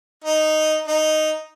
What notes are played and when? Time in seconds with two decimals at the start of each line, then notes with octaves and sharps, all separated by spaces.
0.24 D#4
0.87 D#4